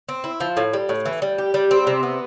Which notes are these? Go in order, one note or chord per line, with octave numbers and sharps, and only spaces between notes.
C4
E4
F3
A2
G3
A2
E3
G3
G4
G3
C4
C3
B3